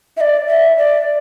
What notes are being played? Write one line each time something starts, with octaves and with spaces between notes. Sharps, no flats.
E5
D5
E5
D5